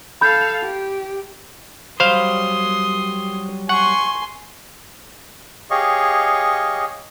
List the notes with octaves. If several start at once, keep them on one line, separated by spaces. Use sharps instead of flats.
A4 F5 B5 G6
G4
F#3 G3 C5 F5 B5 C6 D#6
F#5 G#5 C6 C#6
G4 G#4 C#5 D#5 F5 C#6